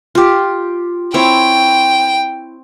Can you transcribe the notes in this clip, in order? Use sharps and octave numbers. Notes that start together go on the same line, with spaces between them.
F4 G4
C4 E4 C#5 G5